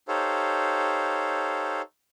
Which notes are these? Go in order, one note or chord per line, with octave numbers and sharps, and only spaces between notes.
D#4 G4 A4 C5 C#5 F5